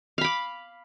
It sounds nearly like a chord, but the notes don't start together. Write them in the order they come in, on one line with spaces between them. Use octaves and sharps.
F5 B5 D6